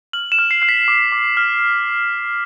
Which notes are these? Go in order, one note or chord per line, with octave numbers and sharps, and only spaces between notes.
F6 F#7
E7
F6
C7
F6 C7
B6
D6
D6
F6